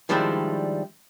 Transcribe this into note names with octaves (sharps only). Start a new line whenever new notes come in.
D#3 F3 G3 G#3 D4 E4